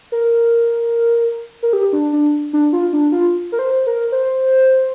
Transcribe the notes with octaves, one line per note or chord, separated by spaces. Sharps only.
A#4
A#4
G4
D4
D4
D4
F4
D4
F4
A#4
C5
A#4
C5